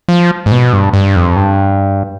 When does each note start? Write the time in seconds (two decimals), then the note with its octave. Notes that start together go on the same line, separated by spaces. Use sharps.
0.08 F3
0.46 G#2
0.52 B2
0.73 G2
0.93 G2
1.16 F2
1.36 G2